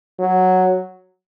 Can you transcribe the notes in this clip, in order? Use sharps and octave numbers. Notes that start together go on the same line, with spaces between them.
F#3